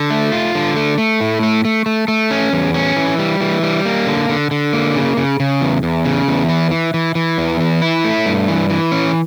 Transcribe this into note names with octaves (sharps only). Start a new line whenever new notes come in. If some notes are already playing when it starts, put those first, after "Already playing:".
Already playing: D3
A3
F4
D3
A3
A3
A2
A3
A3
A3
A3
C#4
E2
C#4
E3
G3
E3
G3
A#3
D3
D3
D3
A#3
C#3
C#3
C#3
E2
E2
C#3
E2
E3
E3
E3
E3
E2
E3
E4
A3
G2
E3
E3
C#4